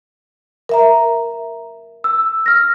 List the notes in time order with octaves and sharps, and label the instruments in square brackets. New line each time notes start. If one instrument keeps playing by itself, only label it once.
[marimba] A#4 E5 A#5
[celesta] E6
F6 A#6